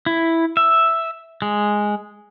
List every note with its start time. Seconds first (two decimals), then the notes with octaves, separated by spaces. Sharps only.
0.06 E4
0.57 E5
1.42 G#3